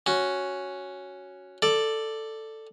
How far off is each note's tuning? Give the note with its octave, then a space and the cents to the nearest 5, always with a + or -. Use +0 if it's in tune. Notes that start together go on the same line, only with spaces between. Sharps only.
C#4 +0 F#4 +0
A4 +5 D5 +5